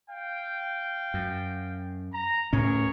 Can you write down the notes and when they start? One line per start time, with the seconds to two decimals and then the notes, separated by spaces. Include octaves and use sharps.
0.11 F5 G5
1.14 F#2
2.12 A#5
2.53 D2 A2 C#4 G#4 A#4 C#5